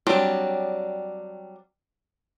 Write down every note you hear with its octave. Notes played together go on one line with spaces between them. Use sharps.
F#3 G3 C4 D4